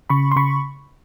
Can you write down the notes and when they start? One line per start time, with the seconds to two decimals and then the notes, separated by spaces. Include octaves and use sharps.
0.10 C#3 B5 C#6
0.32 C6
0.36 C#3 B5 C#6